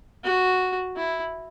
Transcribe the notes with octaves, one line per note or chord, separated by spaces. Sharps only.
F#4
E4